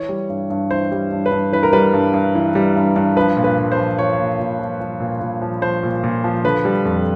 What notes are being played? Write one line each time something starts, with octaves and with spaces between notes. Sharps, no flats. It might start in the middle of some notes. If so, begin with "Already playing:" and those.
Already playing: E3 C#5
G3
G2
G2
E3 C5
G3
G2
B4
G2
E3 B4
A#4
G3 B4
G2
G2
E3
G3
G2
G2
F3 B4
A#2
B4
A#2
C5
F3
F3 C#5
C#5
A#2
A#2
F3
F3
A#2
A#2
F3
F3 C5
A#2
A#2
F3
D3 B4
G3
F2